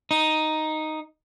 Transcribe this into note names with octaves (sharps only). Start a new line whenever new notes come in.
D#4